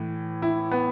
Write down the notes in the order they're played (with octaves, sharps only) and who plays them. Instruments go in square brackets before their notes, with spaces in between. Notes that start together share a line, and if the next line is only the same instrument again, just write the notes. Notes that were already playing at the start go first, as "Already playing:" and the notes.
Already playing: [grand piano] A2 E3
E4
B3